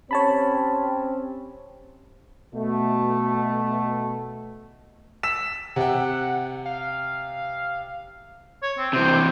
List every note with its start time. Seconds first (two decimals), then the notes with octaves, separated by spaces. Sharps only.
0.11 C4 C#4 G4 C#5 A5 B5
2.54 B2 A3
5.23 E6 B6 E7
5.76 C3 F#5 G5
6.66 F5
8.62 C#5
8.78 C4
8.93 C3 E3 C5